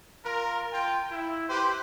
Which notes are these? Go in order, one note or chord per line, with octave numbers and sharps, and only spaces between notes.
F4 A#4
F4 G5
E4
G4 B4 C5